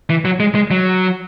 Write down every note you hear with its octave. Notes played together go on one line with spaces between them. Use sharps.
E3
F#3
G#3
G#3
F#3